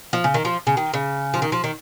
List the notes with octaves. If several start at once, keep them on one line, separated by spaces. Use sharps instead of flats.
F3
C#3
D#3
F3
C#3
D#3
C#3
F3
D#3
F3
D#3